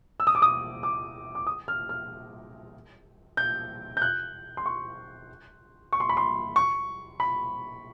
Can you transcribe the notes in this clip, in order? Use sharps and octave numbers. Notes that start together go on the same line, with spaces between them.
E6
D#6
D6
D#6
D6
D6
D#6
F6
F6
G6
G6
F#6
C6
C#6
C#6
C6
B5
C6
C#6
B5